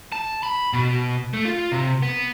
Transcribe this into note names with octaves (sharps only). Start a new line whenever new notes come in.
A5
B5
B2
A3
F4
C3
B3